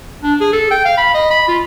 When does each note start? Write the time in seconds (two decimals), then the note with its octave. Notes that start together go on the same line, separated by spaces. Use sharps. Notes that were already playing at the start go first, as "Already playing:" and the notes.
0.23 D4
0.41 G#4
0.53 A4
0.71 G5
0.85 F5
0.98 B5
1.14 D#5
1.30 B5
1.48 F4